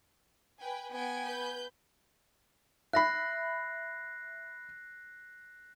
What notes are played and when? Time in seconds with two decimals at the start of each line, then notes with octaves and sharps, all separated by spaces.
0.60 B4 G5 G#5
0.92 B3 G5 G#5 D7
1.24 B4 G6
2.93 E5 B5 F#6 A#6 C7